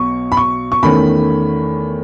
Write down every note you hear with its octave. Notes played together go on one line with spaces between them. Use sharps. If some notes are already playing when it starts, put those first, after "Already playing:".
Already playing: B1 B2 C#6
B5
C#6
C#6
E2 D#3 A3 C#4 B5